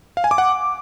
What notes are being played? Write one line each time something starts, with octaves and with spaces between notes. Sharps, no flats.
F5
G#5
D6
F#5